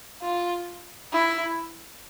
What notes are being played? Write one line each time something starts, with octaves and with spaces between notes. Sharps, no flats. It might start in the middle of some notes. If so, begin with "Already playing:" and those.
F4
E4